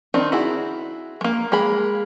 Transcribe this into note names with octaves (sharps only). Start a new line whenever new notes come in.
D#3 C4 D4 D#4
E4 F#4 G#4
G#3 A#3
G#3 A#3 G#4 B5